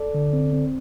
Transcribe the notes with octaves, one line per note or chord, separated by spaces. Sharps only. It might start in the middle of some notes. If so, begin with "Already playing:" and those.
Already playing: A4 D5
D3
C4
C4